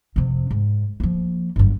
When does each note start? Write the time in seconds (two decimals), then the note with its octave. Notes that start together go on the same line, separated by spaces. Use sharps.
0.16 F2 C3
0.51 G#2
1.00 F3 A#3
1.56 G1 F#2